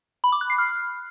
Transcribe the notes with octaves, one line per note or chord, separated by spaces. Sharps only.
B5
D6
F#6
C7
F6